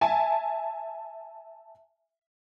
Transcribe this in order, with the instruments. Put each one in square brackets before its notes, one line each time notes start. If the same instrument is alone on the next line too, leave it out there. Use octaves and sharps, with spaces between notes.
[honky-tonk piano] E5 G#5 A5